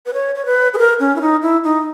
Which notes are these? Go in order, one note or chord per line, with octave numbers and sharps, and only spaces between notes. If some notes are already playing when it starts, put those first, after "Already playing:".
B4
C#5
C#5
B4
G#4
A#4
C#4
E4
D#4
E4
D#4